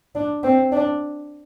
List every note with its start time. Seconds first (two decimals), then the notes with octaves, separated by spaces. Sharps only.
0.15 D4
0.43 C4
0.72 D4